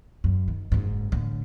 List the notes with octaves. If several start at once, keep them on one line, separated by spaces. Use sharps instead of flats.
F#2
D#3
F#1 G#2
A2 D3